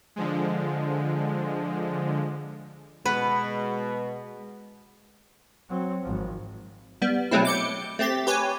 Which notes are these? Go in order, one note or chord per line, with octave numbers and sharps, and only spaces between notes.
D3 F3 G#3
B2 G#3 B3 B4
F#3 C4
G#1 F3
G3 B3
B2 F#3 G#3 A3 C4 E4
D6 G6 C#7
A3 C4 G4 A6 B6
G4 B4 C#5 G#5